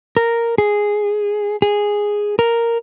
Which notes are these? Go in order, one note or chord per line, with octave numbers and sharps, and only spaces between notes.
A#4
G#4
G#4
A#4